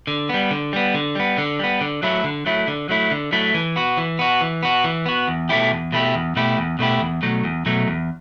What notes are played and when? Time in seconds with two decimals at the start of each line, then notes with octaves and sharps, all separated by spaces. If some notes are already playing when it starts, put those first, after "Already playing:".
0.07 D3
0.29 G3 B3
0.51 D3
0.73 G3 B3
0.94 D3
1.15 G3 B3
1.38 D3
1.59 G3 B3
1.81 D3
2.03 F#3 A3 E4
2.24 D3
2.46 F#3 A3 E4
2.68 D3
2.89 F#3 A3 E4
3.11 D3
3.32 F#3 A3 E4
3.54 E3
3.76 B3 F#4
3.97 E3
4.19 B3 F#4
4.41 E3
4.63 B3 F#4
4.84 E3
5.06 B3 F#4
5.28 E2
5.49 B2 A3 E4 G4
5.71 E2
5.92 B2 A3 E4 G4
6.14 E2
6.36 B2 A3 E4 G4
6.58 E2
6.79 B2 A3 E4 G4
7.00 E2
7.22 B2 F#3 A3
7.44 E2
7.66 B2 F#3 A3
7.88 E2